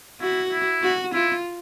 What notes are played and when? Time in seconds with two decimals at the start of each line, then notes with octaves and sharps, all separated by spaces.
0.21 E4 F#4
0.51 E4
0.82 F#4
1.14 E4 F4